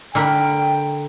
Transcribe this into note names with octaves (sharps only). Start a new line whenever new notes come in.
D3 A#4 G5 B5